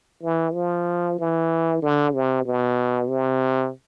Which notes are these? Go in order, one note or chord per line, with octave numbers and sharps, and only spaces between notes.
E3
F3
E3
D3
C3
B2
C3